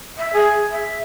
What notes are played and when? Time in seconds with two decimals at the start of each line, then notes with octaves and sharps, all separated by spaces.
0.17 E5
0.33 G#4
0.70 E5